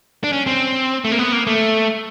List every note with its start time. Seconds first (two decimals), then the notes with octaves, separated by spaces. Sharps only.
0.24 D4
0.33 C#4
0.47 C4
1.04 A3
1.11 A#3
1.19 B3
1.32 A#3
1.47 A3